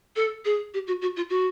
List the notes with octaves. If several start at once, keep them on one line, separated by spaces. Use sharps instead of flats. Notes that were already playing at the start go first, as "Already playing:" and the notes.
A4
G#4
G4
F#4
F#4
F4
F#4